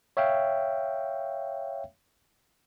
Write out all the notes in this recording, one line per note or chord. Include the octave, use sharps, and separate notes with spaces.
C#5 E5 F5 G5